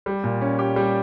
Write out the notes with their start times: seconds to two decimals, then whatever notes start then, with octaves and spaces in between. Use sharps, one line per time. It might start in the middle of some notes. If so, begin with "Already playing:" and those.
0.06 G3
0.24 A#2
0.41 C#4
0.59 G4
0.76 G3